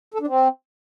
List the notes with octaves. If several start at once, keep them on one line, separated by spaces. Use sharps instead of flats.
A4
D4
C4